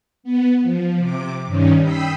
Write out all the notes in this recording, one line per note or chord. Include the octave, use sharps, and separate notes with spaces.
B3
F3
C3 D6
G2 D#3 C#4
G5 B5 D#6 E6 B6 C7